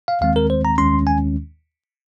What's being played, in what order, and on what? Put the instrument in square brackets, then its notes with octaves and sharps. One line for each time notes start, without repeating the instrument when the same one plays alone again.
[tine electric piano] F5
D#2 D#3 G#3 C4 F5
A#4
C5
A#5
D#2 D#3 G#3 C#4 C6
G#5